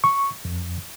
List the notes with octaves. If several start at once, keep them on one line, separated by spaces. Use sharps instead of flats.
C#6
F2